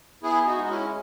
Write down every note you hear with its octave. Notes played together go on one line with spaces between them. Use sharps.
B3 E4 G#4
D#4 F#4
G#3
F#4
C#4 E4